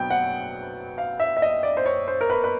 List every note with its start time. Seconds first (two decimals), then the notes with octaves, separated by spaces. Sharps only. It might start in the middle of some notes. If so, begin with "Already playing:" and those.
Already playing: B2 F#3 B3 G5
0.10 F#5
0.98 F5
1.20 E5
1.37 E5
1.42 D#5
1.63 D5
1.77 C5
1.86 C#5
2.08 C5
2.21 A#4
2.30 B4
2.44 B4